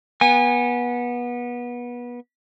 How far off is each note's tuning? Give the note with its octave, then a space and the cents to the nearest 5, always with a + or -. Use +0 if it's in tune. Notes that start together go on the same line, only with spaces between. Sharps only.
B3 -25 G#5 -20